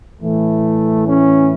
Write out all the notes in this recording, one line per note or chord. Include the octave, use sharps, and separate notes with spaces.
A2 E3 A3
C#4